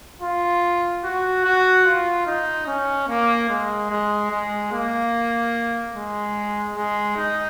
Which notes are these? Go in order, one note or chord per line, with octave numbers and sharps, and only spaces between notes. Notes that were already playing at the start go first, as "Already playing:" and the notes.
F4
F#4
F#4
F4
D#4
C#4
A#3
G#3
G#3
G#3
A#3
G#3
G#3
D#4